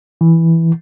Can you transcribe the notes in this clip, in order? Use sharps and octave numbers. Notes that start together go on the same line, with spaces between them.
E3